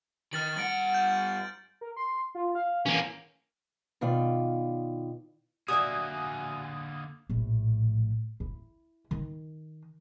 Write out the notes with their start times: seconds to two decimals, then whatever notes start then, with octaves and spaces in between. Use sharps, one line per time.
0.33 D#3 F6 A6 F#7
0.57 G2 F#5 D7 F#7
0.94 G6
1.81 A#4
1.96 C6
2.35 F4
2.55 F5
2.86 E3 A#3 C#4
4.01 B2 D#3 F4 D5
5.68 D3 A#3 F#4 D5 E5 G#5 D#6 G#6
7.29 A#1 A2
8.40 E4
9.11 D#3